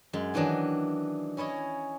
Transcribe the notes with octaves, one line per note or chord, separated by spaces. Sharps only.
F#2 G#3
D#3 E3 F#3 D4 D#5
C#4 E4 C#5 D#5